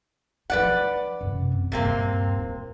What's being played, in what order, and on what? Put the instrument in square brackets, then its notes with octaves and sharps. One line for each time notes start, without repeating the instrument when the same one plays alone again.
[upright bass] F3 D#4 [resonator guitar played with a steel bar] B4 D5 F#5
[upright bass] F#2 C3
C4
[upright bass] D#1 G2 [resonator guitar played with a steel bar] C3 A#3 C4
[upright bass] F4